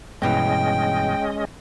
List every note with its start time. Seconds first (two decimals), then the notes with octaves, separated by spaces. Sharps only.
0.22 G2 B2 E3 G#3 C#4 D#5 G5